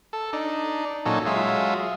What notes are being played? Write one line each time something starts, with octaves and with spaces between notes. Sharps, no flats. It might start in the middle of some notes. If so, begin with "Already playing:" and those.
A4
D4 D#4
A#2 F#3 C#4 D#4 A4
F#3 G#3 F4 E5